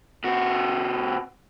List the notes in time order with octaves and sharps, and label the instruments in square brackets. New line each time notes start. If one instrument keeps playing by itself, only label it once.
[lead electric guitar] C3 F#4